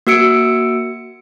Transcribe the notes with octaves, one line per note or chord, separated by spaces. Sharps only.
A#3 F#4 E6 C#7 D7